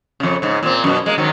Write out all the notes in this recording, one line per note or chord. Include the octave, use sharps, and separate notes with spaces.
F2 C#3
G#2 C#3
A#2 C4
F#2 B2
G#3 A#3
G#2 D#3 F#3